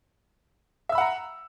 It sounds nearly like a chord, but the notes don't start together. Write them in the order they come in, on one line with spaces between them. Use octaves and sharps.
E5 E6 B5 F#5 A#5